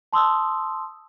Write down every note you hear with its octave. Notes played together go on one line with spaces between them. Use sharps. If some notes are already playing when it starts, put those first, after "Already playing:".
A5 C6 D#6 E6